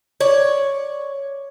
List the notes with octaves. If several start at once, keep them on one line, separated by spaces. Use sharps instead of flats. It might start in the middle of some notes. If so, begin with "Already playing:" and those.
C#5 D5